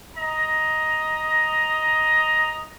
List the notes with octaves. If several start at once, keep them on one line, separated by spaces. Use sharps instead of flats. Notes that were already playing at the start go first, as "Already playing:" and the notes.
D#5 A#5